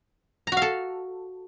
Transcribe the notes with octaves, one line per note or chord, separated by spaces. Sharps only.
F#4 A4 F5 A#5